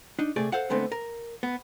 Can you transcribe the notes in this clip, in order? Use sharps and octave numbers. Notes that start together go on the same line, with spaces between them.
D4 D#4
C3 A3 G#4 D5
A4 C5 F5 F#5
D3 G#3 A3 B3 C4
A#4
B3